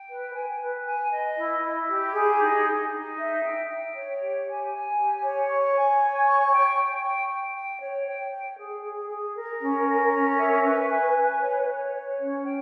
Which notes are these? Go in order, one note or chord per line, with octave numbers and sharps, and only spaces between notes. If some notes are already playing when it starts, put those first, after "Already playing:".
Already playing: G5
B4
G#5
B4
G#5
D#5
E4
E4
G4
G#4
D#4
D#4
D#4
E5
G5
G5
C#5
G4
G#5
G#5
G4
C#5
C#6
G#5
C#5
C#6
G5
G5
G5
G5
G5
C#5
G5
G5
G#4
G#4
G#4
A#4
C#4
A#4
C#4
E5
B4
G#5
B4
C#5
C#5
C#5
C#4
G5